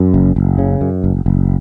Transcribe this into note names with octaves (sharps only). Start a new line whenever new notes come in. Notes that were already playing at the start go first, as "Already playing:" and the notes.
Already playing: F#2
F#1
F#1
C#3
F#2
F#1
F#1